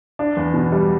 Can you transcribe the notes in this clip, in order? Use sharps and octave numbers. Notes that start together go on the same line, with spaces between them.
D4
E2
B2
G3